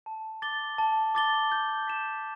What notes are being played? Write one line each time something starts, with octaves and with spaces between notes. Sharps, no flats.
A5
D6 A6 G7
A5
D6 A6 G7
G6
B6 E7